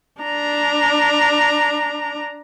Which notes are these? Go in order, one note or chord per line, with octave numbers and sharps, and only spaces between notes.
D4 A#5